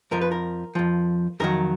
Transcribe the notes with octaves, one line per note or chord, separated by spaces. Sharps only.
F2 F3 A#4
B4
A#4
F2 F3
F2 D#3 F#3 A#4